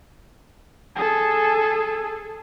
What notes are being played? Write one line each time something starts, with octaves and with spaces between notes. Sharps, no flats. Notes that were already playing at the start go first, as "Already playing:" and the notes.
G#4 A4